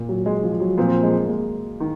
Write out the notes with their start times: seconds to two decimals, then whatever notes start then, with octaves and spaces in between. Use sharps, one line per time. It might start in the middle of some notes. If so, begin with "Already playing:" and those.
Already playing: A#2
0.09 F#3
0.26 G#3
0.43 F3
0.60 F#3
0.77 A#2 F3 A#3 C4
1.03 G#3
1.24 A#3
1.29 G#3
1.80 D#3